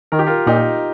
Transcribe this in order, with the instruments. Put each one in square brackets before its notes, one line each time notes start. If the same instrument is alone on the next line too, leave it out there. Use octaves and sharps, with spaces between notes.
[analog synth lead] D#3 [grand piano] A#4
[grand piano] G4
F4 A#4
[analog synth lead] A#2 [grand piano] D#4 G4